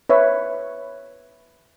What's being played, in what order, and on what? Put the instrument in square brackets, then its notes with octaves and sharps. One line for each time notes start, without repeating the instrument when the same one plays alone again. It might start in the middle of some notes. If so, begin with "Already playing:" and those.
[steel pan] B4 C#5 E5